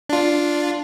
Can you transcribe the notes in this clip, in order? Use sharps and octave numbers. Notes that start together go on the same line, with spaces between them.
D4 F4